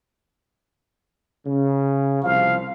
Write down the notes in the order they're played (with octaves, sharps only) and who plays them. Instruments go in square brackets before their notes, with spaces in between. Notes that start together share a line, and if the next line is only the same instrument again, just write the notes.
[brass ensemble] C#3
[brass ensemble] C2 F3 [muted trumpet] F5